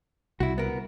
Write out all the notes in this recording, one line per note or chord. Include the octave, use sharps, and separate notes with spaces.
C2 E4 F#4
B3 A#4